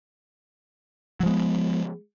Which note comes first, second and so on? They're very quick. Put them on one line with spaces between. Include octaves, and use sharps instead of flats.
F#3 F3 G#3 B3